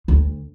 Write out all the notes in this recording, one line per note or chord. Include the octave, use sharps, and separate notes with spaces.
D2